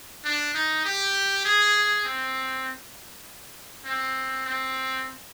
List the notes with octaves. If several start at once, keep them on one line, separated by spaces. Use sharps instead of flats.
D4
D#4
G4
G#4
C4
C4
C4